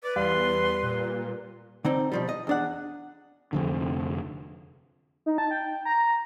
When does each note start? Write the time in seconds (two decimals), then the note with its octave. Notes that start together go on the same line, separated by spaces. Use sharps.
0.04 B4 D5
0.16 E2 G3 F5 C6
0.83 A#2
1.85 D3 C4 D#4
2.12 B2 F3 G3
2.29 D#5
2.47 E2 D4 F#5
3.53 F1 F2 D3
5.26 D#4
5.38 A5
5.51 G5
5.85 A#5